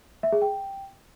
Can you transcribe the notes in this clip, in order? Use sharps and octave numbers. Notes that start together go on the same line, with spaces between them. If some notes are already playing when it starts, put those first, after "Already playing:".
E5
G#4
G5